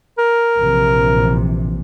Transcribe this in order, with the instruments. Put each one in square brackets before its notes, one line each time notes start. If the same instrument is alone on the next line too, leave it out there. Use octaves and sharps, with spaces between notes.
[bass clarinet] A#4
[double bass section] A#1 C3 E3